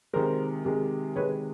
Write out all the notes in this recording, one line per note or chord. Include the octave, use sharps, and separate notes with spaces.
C3 D#3 G#3 A#4 C5
C3 D#3 G#3
C3 D#3 G#3 B4 C#5